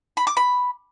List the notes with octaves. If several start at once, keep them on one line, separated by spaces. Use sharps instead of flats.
B5
D6
B5